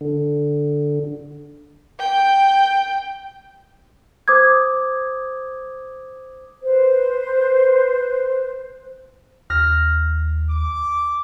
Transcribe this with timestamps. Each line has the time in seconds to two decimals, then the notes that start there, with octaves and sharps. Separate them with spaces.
0.01 D3
1.99 G5
4.28 C5 D6 D#6 G#6
6.62 B4 C5
9.50 D#2 F6 A#6
10.50 D6